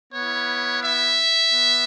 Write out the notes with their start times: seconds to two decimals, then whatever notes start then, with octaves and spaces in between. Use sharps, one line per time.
0.14 B3 E4 C#5
0.84 E5
1.54 B3